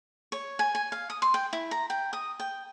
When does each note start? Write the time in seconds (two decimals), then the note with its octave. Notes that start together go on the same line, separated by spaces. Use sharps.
0.32 C#5
0.59 G#5
0.75 G#5
0.92 F5
1.10 D#6
1.22 C6
1.34 G5
1.53 E4
1.71 A#5
1.90 G5
2.13 D#6
2.40 G5